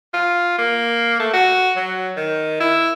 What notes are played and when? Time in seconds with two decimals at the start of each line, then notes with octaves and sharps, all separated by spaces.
0.13 F4
0.58 A#3
1.19 A3
1.33 F#4
1.76 F#3
2.16 D#3
2.60 E4